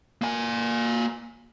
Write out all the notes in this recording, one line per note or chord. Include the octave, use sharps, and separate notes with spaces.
A#3 G#5